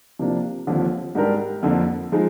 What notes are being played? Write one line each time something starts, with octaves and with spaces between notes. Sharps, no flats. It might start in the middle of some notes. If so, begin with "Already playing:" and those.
C3 F3 A#3 D4
D#2 D3 F3 C4
G#2 G3 D4 G4 A#4
F2 D3 F3 A#3
F3 G#3 D#4